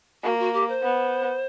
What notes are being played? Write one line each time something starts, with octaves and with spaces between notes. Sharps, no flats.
A#3 F#4
F#4
G4
C5
B3